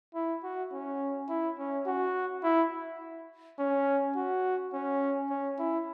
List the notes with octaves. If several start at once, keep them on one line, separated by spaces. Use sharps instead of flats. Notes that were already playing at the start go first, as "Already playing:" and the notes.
E4
F#4
C#4
E4
C#4
F#4
E4
C#4
F#4
C#4
C#4
E4